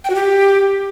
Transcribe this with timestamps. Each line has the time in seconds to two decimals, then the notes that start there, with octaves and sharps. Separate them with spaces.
0.04 G5
0.10 F#4
0.15 G4